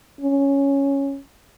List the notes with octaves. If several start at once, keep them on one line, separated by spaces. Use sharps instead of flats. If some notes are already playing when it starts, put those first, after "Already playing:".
C#4